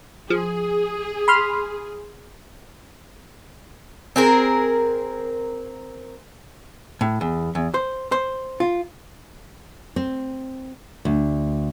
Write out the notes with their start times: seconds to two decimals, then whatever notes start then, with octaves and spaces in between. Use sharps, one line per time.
0.30 F3 G#4
1.28 B5 C6 F6
4.16 C4 G#4 A#4
7.01 A2
7.21 E2
7.55 E2
7.74 C5
8.12 C5
8.60 F4
9.96 C4
11.05 D2